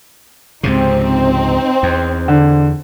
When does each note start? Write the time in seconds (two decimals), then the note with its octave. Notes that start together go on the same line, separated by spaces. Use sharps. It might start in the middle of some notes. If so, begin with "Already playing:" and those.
0.63 C#2 G#2 C3 C4 D#4
1.83 E2
2.28 D3